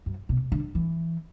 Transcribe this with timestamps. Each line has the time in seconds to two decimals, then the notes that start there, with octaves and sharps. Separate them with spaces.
0.06 F#2
0.29 B2
0.52 D3
0.75 E3